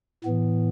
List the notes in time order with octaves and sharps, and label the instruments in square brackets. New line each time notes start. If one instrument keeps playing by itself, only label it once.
[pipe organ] A2 E3 B3